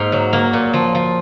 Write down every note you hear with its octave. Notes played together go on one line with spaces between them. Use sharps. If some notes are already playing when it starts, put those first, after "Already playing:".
Already playing: G#2 A#3 F5
F#3
A#3
A#2
F3
F3